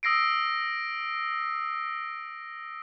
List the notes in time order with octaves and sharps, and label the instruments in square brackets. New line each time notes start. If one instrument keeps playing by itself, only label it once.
[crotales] D#6 E6 A#6 C7 D7